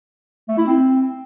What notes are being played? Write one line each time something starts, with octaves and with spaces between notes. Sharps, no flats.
A3
E4
C4